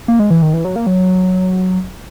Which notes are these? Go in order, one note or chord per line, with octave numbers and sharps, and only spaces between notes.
A#3
G#3
E3
D#3
E3
F#3
A#3
F#3